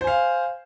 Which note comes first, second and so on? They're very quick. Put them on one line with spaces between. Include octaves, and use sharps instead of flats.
C5 G#5 F5